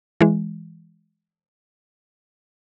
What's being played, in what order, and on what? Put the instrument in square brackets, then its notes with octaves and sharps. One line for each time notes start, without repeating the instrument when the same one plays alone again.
[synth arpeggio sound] E3 G#3